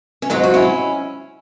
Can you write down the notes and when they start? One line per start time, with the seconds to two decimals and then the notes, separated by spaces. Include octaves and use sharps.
0.22 C#4
0.30 G#2 F#3 C4 D#4
0.43 F#4
0.54 C#4 E4